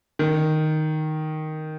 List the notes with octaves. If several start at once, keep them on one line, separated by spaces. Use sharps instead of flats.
D#3